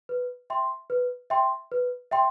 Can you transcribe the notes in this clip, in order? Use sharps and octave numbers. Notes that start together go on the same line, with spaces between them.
B4
E5 G5 C6
B4
E5 G5 C6
B4
E5 G5 C6